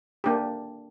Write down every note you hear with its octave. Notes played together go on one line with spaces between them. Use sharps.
A#3 D4 G4